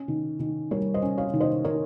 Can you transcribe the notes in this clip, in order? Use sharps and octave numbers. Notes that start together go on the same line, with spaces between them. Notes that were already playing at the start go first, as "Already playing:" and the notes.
Already playing: C#4
D#3
D#3
G3 A#4 C#5
C5 D#5
C#4
C#5 F5
D#3
C5 D#5
D#3 A#4 C#5